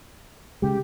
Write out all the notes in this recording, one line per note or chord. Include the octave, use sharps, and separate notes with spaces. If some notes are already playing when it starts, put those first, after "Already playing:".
C#3 G#3 G4